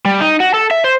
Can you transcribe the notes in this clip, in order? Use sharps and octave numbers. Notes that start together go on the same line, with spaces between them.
G3
D#4
F#4
A4
E5
C5